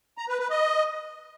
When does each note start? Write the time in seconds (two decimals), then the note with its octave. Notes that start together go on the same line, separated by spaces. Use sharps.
0.18 A#5
0.29 B4
0.39 B4
0.50 D#5